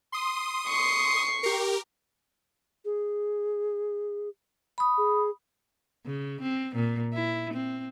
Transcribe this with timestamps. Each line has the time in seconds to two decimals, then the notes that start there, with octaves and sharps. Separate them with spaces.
0.12 C6 D#6
0.67 C#6 C7
1.43 G4 A#4
2.85 G#4
4.78 B5 D#6
4.98 G#4
6.06 C#3
6.42 C4
6.76 A#2
7.14 E4
7.54 C4